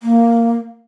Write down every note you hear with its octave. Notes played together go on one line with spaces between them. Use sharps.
A#3